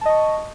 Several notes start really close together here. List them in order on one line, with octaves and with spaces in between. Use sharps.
A5 D#5 C#6